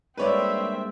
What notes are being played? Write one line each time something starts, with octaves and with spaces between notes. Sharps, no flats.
G2 G#3 A#3 C4 B4 C#5 D5 E5